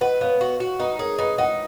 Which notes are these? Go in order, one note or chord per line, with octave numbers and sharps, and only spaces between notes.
B4 D#5 F#5
B3 C#5 F5
F#4
F#4
D#4 B4 D#5
G#4 A#4 C#5
D#4 B4 D#5
D#4 D#5 F#5